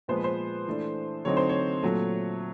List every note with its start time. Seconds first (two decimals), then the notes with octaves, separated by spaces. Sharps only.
0.08 A#2 F3 G#3 B3 C5
0.16 B4
0.24 C5
0.67 E3 A3 D4
1.25 D3 F#3 A3 C4 D#4 C#5
1.37 C5
1.49 C#5
1.82 A#2 F#3 A3